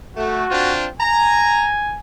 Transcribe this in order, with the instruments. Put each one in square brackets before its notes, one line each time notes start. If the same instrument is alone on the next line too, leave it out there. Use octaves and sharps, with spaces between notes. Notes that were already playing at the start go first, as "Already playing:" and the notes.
[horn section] A3 [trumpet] F#4
[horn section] C4 D4 F4
[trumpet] G#5 [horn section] A#5